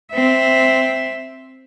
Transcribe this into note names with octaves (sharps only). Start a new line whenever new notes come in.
C4 E5